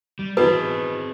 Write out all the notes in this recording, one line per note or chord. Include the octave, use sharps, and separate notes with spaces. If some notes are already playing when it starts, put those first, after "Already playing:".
G3
B2 E3 C4 G#4 B4